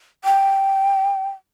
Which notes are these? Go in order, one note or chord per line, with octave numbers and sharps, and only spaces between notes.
G5